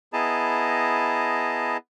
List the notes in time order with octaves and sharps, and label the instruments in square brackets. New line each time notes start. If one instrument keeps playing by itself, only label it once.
[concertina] B3 E4 G#4 D#5 A5 A#5